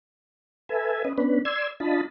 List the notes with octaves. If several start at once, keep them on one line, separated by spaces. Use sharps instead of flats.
A4 B4 E5 G#5
C#4 B4 D#5
B3 C#4 D4 B4
D5 C6 E6 G#6
D4 F4 D#5 A5 B5